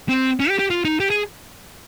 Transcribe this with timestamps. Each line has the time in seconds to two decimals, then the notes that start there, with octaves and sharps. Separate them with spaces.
0.09 C4
0.40 C#4
0.49 G4
0.59 G4
0.70 F4
0.85 D#4
1.00 G4
1.10 G#4